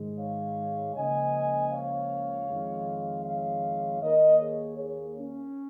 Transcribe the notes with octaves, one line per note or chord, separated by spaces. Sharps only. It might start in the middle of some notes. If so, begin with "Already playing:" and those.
Already playing: G#2 D#3 G#3
C#5 F5
C#2 C#3 F3 A#3 D#5 G#5
C#5 F5
F2 D#3 G#3
C#5 F5
D#2 D#3 A#3 A#4 D#5
G#4 C#5
G#4 C#5
C#4